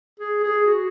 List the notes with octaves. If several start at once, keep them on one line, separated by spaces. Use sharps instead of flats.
G#4
G#4
F#4